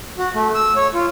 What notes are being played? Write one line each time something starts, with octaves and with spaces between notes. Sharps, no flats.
F#4
A3
E6
C#5
F4